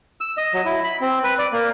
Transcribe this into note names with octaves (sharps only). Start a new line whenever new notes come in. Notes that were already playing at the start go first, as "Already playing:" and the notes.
E6
D#5
F#3
E4
B5
C4
B4
D5
A#3